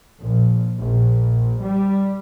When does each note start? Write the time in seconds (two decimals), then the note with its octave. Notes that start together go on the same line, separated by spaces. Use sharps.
0.21 A#1
0.78 A#1
1.61 G3